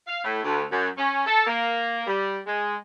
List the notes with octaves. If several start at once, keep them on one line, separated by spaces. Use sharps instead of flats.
F5
A2
D2
F#2
C#4
A4
A#3
G3
G#3